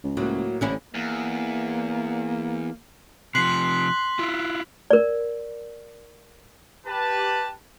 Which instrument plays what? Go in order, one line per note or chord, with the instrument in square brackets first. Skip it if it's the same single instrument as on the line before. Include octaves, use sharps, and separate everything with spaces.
[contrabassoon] C#2
[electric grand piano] A2 A#3 [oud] F#3
[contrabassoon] A1 [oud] D3 C#4 E4
[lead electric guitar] E2 [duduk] A#3
[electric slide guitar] C3 F3 [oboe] C6 [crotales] F#6 B6 F#7
[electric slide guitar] E4 F4
[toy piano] A#4 D5
[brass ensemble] G4 B4 A5